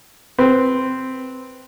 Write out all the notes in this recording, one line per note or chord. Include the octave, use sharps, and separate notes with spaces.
C4 B4